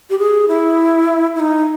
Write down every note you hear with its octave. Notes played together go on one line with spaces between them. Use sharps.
G4
G#4
E4
E4
D#4